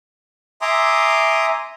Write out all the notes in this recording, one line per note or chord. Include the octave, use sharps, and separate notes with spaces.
E5 G#5 A#5 C6 D6 D#6